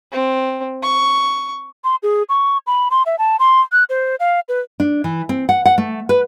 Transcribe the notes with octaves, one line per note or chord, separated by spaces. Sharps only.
C4
C#6
C6
G#4
C#6
B5
C6
E5
A5
C6
F#6
C5
F5
B4
D4
E3
C4
F#5
F#5
A3
B4